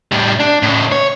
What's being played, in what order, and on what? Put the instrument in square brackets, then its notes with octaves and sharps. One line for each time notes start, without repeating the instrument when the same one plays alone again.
[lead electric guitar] A2 G3
D4
A2 C#3
C#5